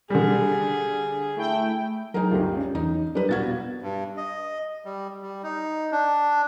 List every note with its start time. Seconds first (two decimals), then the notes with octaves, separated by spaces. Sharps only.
0.10 D3 G3 G#4
1.36 A3 E4 G5
2.14 F#3 D#4 F#4 G#4 A#4
2.31 D2 G2 F4 G4
2.57 C#4
2.75 E2 D#4
3.15 G3 D4 A#4 B4
3.29 B2 F#4 F5 G#6 A6
3.82 G2
4.17 D#5
4.85 G3
5.22 G3
5.43 D#4
5.92 D4